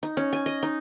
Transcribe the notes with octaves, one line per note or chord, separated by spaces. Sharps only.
D#4
C#4
G#5
D#5
D#4